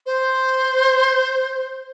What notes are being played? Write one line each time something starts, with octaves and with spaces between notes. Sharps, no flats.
C5